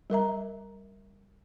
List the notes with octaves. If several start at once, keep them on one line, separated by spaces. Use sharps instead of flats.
G3 A#4 E5 A#5